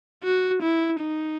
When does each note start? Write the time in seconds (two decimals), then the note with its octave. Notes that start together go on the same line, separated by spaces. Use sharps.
0.24 F#4
0.63 E4
1.02 D#4